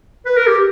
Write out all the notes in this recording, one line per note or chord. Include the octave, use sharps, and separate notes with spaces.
B4
A#4
G4